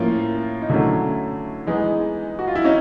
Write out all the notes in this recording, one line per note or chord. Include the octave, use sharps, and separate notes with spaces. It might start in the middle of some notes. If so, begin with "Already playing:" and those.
Already playing: A2 F3 A#3 C#4 F4
D#4
D3 F#3 A3 C#4 E4
E3 G#3 B3 D#4
F#4
F4
E4
C#4 D#4